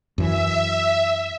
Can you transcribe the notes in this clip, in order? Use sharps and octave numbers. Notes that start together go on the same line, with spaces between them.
F#2 E3 E5